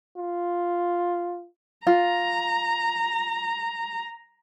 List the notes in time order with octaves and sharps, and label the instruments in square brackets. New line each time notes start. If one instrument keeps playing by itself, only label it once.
[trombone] F4
[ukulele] F4 [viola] A#5